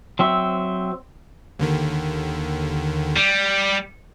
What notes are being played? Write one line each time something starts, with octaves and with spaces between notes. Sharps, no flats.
F#3 C4 E5
D#2 D3 D#3
G3